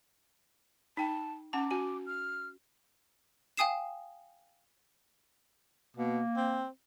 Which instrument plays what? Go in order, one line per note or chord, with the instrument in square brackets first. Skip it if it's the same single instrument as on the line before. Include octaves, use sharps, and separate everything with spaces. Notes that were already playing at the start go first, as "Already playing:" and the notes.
[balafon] D#4 G5 [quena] A5
[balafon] C#4 F#5 A5 [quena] D6
[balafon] F#4 G#5
[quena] F6
[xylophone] F5 G5 G#5 D#6 C7 E7
[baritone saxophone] B2 [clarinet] A#3
[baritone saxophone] C4